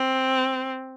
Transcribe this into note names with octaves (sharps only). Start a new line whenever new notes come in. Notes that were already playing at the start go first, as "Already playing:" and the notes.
Already playing: C4